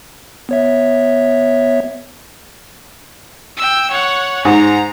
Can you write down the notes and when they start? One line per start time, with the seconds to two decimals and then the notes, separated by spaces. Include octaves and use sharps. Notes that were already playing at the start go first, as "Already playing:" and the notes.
0.49 B3 C#5 E5
3.57 G5 E6
3.91 C#5 F#5
4.45 G#2 A#5